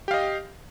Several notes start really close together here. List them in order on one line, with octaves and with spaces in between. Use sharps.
G4 F5 D#5